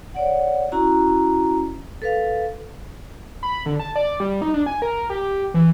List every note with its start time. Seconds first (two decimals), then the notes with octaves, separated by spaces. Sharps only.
0.15 C#5 D5 F#5
0.72 C#4 E4 F#4 A#5
2.02 A4 B4 F5
3.43 B5
3.66 D3
3.79 A5
3.96 D5
4.20 G3
4.41 D#4
4.54 D4
4.66 G#5
4.82 A#4
5.10 G4
5.54 E3